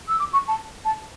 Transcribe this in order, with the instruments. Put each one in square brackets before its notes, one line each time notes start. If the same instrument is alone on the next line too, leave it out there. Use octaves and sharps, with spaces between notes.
[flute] E6
D6
C#6
A5
A5